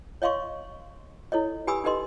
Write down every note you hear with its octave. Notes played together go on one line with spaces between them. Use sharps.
C#5 D#5 F5 C6 C#6
E4 A4 C#5 D#5
G4 B4 G#5 B5 D#6 E6
D#4 G4 A4 B4 D#5 C6